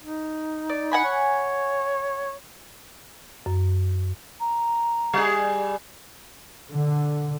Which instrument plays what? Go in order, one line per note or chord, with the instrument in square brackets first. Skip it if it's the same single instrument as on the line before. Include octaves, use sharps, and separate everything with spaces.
[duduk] D#4
[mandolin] D5
F#5 G#5 B5
[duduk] C#5
[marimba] F#2
[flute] A#5
[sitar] G3 G#4
[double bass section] D3